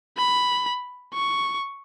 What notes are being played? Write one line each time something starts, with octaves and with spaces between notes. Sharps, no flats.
B5
C#6